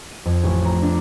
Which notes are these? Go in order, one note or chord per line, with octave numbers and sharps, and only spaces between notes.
D#7
F2
A1
A#5
D4